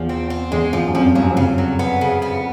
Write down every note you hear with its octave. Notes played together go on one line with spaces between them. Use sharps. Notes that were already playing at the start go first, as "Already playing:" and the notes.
Already playing: E2 F3
C4
C4
E2 G#3
E2 F3
F#2
F2 F3
G2 F#3
F#2
F2
F#2 C#3
F#3
B3
C#3
B3